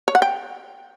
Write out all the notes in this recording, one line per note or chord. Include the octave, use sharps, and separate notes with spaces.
C#5
F#5
G5